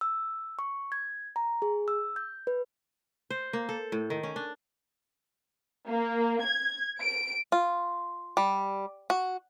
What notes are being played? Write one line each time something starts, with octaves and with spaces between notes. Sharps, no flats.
E6
C#6
G#6
A#5
G#4
E6
G6
B4
C5
A#3
A4
A2
D#3
C#4
D4
A#3
G#6
D7
F4
G3
F#4